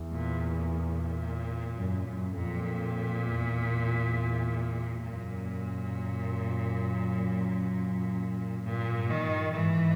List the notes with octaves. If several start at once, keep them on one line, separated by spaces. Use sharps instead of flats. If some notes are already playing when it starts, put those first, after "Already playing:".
Already playing: E2
A#2
A#2
F#2
F#2
F2 A#2
E2
F#2 A#2
G2 A#2
G2
D#3
G2
G#2 E3